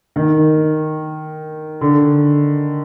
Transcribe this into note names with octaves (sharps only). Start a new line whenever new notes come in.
D#3
D3